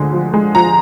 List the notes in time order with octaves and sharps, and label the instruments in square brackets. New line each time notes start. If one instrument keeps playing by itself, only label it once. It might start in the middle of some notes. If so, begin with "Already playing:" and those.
Already playing: [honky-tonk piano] D2 D3 F3 G#3
F3
G#3
F3 A#5